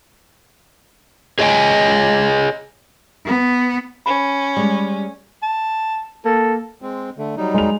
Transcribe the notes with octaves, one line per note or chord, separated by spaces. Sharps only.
G#4 C#5 D#5 E5 G5 G#5
B3
C#4 B5
G3 G#3
A5
A#3 A4
G#3 C4
D3 A3
F#3 G3 D#4
G#3 F7